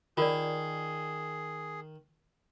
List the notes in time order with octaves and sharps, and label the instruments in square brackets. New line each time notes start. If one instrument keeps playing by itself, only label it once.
[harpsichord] D#3 [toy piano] F4 A#4 D5 [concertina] G#4